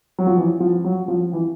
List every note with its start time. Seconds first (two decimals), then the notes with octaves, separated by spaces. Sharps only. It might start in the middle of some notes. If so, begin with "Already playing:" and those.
0.19 F#3
0.27 F3
0.37 E3
0.60 F3
0.85 F#3
1.08 F3
1.33 E3